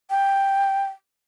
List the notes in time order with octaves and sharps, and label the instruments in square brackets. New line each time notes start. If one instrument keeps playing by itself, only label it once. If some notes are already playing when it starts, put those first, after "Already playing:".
[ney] G5